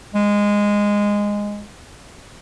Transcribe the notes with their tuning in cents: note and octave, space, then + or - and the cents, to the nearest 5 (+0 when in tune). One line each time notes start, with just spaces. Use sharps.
G#3 -10